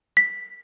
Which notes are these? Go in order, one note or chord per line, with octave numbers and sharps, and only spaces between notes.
B6